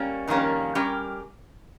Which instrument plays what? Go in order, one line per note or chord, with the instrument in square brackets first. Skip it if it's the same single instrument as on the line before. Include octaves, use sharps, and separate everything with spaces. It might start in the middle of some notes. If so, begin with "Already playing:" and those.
Already playing: [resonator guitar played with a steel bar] G3 A#3 C#4
F2 D#3 G3 A#3 C#4
G3 C#4 G4 A#4